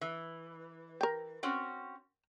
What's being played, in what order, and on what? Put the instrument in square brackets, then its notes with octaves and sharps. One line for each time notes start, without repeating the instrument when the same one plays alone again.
[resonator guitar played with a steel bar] E3
[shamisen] A#4 G5
[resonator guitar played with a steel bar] C4 C#4 F#4